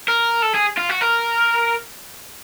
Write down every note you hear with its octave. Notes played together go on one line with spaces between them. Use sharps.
A#4
A4
G#4
F4
F#4
A#4